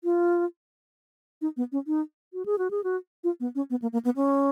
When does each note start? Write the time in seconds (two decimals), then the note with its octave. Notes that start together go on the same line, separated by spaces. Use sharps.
0.04 F4
1.42 D#4
1.57 B3
1.72 C#4
1.87 D#4
2.33 F#4
2.46 G#4
2.58 F#4
2.71 G#4
2.84 F#4
3.24 F4
3.40 B3
3.55 C#4
3.70 B3
3.82 A#3
3.93 A#3
4.05 B3
4.16 C#4